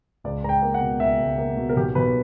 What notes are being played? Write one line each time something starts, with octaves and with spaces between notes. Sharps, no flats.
C#2 D5
C#2 A#5
G5
A#3
F#5
B2
C#2 E5
C#2
A#3
B2
A#4
B1 G4
B1 B4